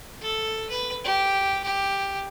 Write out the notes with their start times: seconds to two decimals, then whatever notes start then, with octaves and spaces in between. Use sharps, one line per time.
0.21 A4
0.70 B4
1.04 G4
1.64 G4